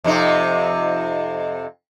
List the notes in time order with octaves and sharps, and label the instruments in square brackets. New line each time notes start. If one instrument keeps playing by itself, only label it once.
[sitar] F2 C3 D#4